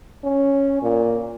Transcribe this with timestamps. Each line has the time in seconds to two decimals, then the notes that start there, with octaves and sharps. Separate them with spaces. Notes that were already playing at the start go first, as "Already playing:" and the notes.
0.24 C#4
0.82 A#2